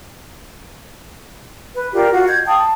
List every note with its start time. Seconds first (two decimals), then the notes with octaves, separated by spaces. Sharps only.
1.74 B4
1.93 F4 G4 A#4 D5
2.12 F4 F#4
2.27 D#5 G6 G#6
2.46 F5 G5 A5 D#6
2.57 A5